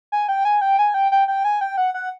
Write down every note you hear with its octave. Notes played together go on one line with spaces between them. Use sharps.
G#5
G5
G#5
G5
G#5
G5
G5
G5
G#5
G5
F#5
F#5